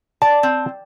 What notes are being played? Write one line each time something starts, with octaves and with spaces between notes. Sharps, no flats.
D5 A5
C4